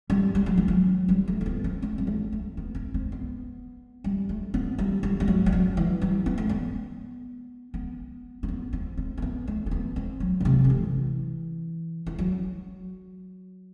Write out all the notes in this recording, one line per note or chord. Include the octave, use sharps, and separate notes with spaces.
G3
G3
F#3
E3
F#3
G3
A3
C4
B3
C4
C4
G3
A3
A3
B3
C4
C4
B3
G3
A3
B3
G3
G3
G3
F#3
G3
F#3
E3
G3
B3
A3
B3
B3
C4
B3
C4
C4
C4
B3
A3
A3
B3
C4
F#3
D3
C3
D3
E3
E3
F#3